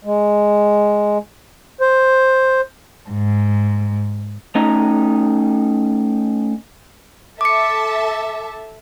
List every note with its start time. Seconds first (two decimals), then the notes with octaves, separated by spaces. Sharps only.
0.05 G#3
1.81 C5
3.09 G#2
4.55 A3 C#4 D#4 D#5 A#5
7.41 A4 E5 A5 D6 C#7